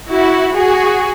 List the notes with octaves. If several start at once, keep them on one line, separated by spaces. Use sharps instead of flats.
E4 F#4
F#4 G#4